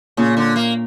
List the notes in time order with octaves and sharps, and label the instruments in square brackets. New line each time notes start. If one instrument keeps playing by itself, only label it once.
[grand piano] A#2 [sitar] C#3
[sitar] D3
A#3